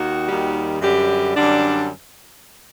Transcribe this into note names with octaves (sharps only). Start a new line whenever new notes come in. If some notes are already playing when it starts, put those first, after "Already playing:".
Already playing: D#2 D#3 F#4
D#2 D#3 G3
F#2 D3 G3 G4
F#2 D3 G3 D4